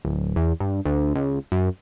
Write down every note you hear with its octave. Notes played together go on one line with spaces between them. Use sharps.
D1
E2
G2
D2
C#2
F#2